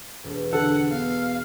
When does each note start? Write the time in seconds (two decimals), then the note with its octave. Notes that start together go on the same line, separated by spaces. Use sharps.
0.24 E1 A3
0.53 D3 A4 F#5
0.92 B3 F5